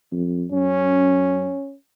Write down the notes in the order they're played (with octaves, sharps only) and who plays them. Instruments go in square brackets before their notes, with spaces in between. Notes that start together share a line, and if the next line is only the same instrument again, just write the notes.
[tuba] F2
[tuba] F#2 [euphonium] C#4